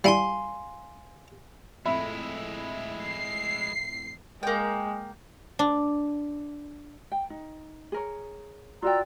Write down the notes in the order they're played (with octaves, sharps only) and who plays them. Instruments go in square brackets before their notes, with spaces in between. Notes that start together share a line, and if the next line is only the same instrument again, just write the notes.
[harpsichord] G3 E4 [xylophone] F5 G#5 C6
[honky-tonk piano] F2 A2 A3 [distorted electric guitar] G#3 E4 [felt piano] E5 B5
[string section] C7
[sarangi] G#3 [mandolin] A#3 G5
[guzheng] D4
[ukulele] G5
D#4
G#4 A#4 C#5
[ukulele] F4 F#4 G5 [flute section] D5 A#5 E6